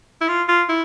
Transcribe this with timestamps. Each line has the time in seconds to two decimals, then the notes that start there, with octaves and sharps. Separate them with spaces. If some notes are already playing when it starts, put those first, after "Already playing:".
0.21 E4
0.28 F4
0.48 F4
0.69 E4